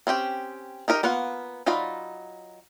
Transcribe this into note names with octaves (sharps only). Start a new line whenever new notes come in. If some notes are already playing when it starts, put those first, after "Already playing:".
C4 C#4 G4 G5
D#4 G4 A#4 D#5
A#3 B3 F4 F#5
F#3 D#4 F4 D5 B5